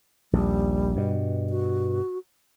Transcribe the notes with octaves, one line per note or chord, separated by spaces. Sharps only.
A#1 D#2 G3
G2 B2
F#4